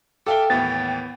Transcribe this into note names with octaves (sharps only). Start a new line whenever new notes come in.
A4 E5 F5 G5 D6 G7
D#2 A2 E3 B3 A6